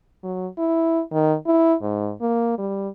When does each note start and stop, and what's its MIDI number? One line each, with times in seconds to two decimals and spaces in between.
0.23 0.47 54
0.58 1.02 64
1.12 1.35 51
1.47 1.74 64
1.82 2.12 44
2.21 2.58 58
2.58 2.88 55